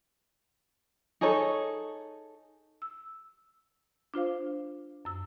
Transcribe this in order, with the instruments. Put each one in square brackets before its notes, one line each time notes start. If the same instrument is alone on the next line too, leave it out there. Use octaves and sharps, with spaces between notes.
[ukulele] D#4 G#4 A4 C#5
[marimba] E6
D4 F4 C5 F5
F#2 E6